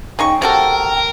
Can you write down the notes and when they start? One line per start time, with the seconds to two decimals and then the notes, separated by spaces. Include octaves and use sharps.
0.19 C#3 D#4 G5 C#6
0.42 C3 F#4 A4 A#4